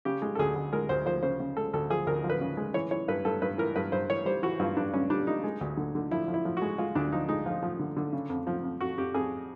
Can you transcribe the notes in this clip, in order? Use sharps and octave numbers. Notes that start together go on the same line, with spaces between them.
C#3 G4
G#3
A4
D2 G#4
D2
G#3 A#4
D2 C5
F3 C5
C#3 C5
C#3
G#3 A4
D2 A4
F3 G#4
D2 A#4
F3
B4
C#3
G#3
E3 C#5
E3 C#5
G2 B4
G2 A4
G2 B4
E3 A#4
G2 B4
G2 C5
E3 C#5
G3 C5
E3 F#4
G2 F4
G2 D4
G2 C#4
G3 D4
G3 D#4
G#3
D2
D3
D3
F3 E4
F3
E4
F3
F#4
G#3
G#3 F4
D2 D4
F3 D#4
G#3 D#4
F3 F4
F3
D3
D3
C#3
F2
F3
F2
F2 F#4
F2 G4
F2 G#4